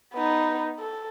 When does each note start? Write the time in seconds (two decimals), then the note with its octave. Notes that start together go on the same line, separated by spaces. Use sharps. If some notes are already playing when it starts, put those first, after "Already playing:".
0.13 B3 D#4
0.79 A4